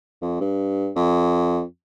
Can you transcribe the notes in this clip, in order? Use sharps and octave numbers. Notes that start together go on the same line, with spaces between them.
F2
G2
F2